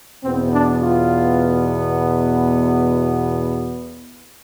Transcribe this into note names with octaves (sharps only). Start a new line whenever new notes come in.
E2 B2 B3 C4
D4
F4